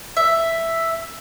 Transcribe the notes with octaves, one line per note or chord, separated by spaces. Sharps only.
E5